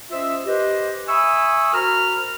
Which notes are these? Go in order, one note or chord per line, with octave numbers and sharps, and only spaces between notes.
C#4 F4 C5 D#5 E5
G4 B4 C5 D#5
E5 G#5 B5 C#6 D#6 E6
F#4 A#4 C5 A#5 B5 F6